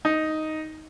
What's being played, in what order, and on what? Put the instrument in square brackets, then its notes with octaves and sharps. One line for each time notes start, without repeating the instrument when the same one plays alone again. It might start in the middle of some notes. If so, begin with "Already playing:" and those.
[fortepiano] D#4